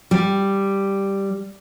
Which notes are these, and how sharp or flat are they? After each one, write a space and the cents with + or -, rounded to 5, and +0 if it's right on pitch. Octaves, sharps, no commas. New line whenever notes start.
G3 +0